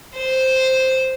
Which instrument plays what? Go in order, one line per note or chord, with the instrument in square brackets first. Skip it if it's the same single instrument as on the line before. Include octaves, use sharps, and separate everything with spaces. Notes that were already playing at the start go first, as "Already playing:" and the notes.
[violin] C5